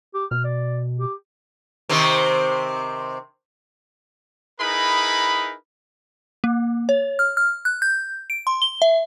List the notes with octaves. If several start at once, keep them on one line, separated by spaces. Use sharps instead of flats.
G4
B2 F6
D5
G4
C3 D#3 C4
D#4 E4 G#4 A#4 B4 B5
A#3
C#5
F6
F6
F#6
G6
D7
C6
G7
E5